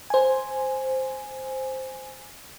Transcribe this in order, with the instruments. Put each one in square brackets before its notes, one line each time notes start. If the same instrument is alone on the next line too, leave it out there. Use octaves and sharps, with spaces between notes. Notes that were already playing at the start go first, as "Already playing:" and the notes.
[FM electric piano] C5 G#5